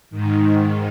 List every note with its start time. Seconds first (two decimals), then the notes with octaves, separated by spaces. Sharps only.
0.10 G#2 D#3